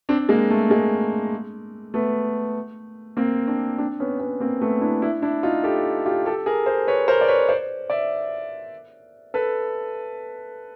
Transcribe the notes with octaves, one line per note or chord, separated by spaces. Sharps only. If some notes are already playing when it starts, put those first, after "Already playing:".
C4 D4
G#3 A#3
A3
G#3 A#3
A3 B3
A#3 C4
C4 D4
C4 D4
B3 C#4
B3 C#4
A#3 C4
A3 B3
D4 E4
D4 E4
D4 E4
D#4 F4
G4 A4
F4 G4
G4 A4
G#4 A#4
A#4 C5
B4 C#5
A#4 C5
D5
B4 C#5
C5 D5
D5 E5
A4 B4